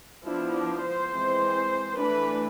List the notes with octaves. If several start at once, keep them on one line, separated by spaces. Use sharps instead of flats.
F3 B3 D4 E4
D4
C5
E3 G#3 C4
E3 A3 D4 B4